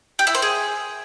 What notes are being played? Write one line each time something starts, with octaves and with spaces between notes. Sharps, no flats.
G4
E4
C5
G#4